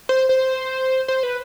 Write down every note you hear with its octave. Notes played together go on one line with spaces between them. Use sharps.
C5
C5
C5
B4